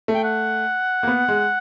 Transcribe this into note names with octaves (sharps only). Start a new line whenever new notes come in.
A3
G5
F#5
A#3
B3
G#3